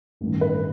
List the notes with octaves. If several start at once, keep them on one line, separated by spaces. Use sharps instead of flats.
A1 G2 D#3
B4